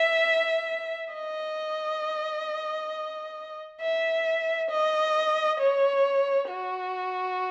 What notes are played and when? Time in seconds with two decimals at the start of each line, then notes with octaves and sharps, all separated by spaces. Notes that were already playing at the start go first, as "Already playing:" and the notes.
Already playing: E5
1.13 D#5
3.81 E5
4.70 D#5
5.60 C#5
6.50 F#4